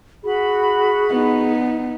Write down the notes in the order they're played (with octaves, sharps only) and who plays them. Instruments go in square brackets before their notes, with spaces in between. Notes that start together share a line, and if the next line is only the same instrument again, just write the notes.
[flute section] F#4 B5 [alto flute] G#4
[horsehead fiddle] B3 D#4